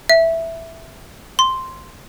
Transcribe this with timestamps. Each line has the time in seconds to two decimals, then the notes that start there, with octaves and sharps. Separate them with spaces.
0.09 E5
1.39 C6